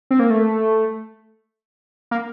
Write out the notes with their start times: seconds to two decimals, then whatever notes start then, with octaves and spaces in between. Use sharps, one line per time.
0.11 C4
0.19 A#3
0.30 A3
2.11 A#3